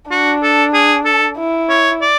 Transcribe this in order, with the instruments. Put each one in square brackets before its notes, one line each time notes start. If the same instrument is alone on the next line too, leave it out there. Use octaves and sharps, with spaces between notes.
[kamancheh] D4 [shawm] F#4
[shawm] A4
G#4
A4
[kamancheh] E4
[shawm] C#5
D5